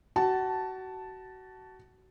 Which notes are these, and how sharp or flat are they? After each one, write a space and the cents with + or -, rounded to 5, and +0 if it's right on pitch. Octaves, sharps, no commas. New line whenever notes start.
F#4 +25 A5 +0